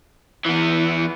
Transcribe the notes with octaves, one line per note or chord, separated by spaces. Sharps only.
E3 B3